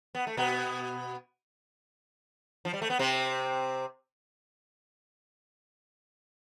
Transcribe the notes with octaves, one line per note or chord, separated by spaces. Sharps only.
B3
A3
B2 B3
F3
G3
A3
B3
C3 C4